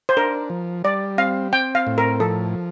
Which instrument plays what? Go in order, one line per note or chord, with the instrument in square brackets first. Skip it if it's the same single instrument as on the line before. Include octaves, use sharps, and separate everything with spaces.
[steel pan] C5
[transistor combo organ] D4 [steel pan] A#4
[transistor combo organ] F3
[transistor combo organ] G3 [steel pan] D5
[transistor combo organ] C4 [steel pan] F5
[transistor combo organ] C4 [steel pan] G5
[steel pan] F5
[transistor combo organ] A2
[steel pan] A#4
[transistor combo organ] F3 [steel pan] A4